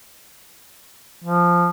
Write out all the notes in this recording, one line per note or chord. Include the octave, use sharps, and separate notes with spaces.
F3